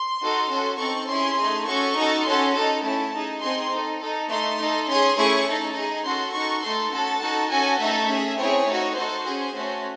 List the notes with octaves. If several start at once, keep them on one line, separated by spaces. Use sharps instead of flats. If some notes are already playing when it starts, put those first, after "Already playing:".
Already playing: C6
D#4 F#4 A4
C#4 F#4 A4
C4 D#4 A4 C#6
C#4 E4 G#4 C6
A3 D#4 G#4
C#4 F#4 A4 C#6
D#4 F#4 A4
C#4 F#4 A4 C6
D#4 A4 A5
A3 C#4 E4 A5
D#4 G#4
C4 D#4 G#4 C6
D#4 A4
D#4 A4
A3 D#4 A4 C6
D#4 A4
C#4 G#4 C6
A3 C#4 E4 G#4 C#6
D#4 A4
D#4 G#4
C#4 F#4 A4 C6
D#4 F#4 A4 C#6
A3 D#4 A4 C6
C#4 F#4 A4 A5
D#4 F#4 A4
C#4 F#4 A4 G#5
A3 D#4 A4 E5
C#4 G#4
C4 E4 G#4 C#5
A3 D#4 F#4
D#4 F#4 A4 C5
C#4 G#4
A3 C#4 F#4